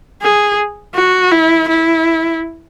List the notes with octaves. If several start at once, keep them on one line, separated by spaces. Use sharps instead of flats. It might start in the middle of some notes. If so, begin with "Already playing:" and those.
G#4
F#4
E4
E4